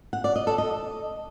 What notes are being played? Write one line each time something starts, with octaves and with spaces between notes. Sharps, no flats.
F#5
D5
D#5
A4
D#5